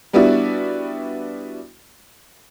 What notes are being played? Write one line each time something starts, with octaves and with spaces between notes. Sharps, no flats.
G3 B3 D4 E4 F#4